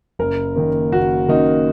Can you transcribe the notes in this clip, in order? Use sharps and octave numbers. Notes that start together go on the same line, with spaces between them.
F#1 A#4
F#2 D#3 A#3
F#1 F#4
F#2 D#3 A#3 D#4